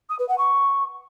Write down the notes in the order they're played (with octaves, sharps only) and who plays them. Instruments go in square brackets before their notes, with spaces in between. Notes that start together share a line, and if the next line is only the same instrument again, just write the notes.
[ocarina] D#6
B4
F#5
C#6